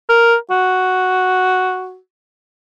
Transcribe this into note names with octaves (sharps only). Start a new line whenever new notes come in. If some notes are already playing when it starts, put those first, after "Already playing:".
A#4
F#4